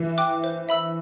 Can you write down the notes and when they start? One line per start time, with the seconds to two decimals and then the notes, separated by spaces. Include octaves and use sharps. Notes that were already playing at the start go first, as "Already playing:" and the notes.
Already playing: E3
0.18 G5 D6 F#6
0.44 C5
0.69 E5 B5 E6